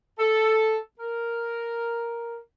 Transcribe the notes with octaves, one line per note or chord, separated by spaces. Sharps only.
A4
A#4